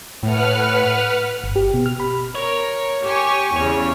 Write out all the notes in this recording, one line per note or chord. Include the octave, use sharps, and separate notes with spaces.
A2 B4 F#5 F6
G1
G4
B2
F6
B5
A#4 C#5
G4 G#5 C#6
E2 C#3 C#5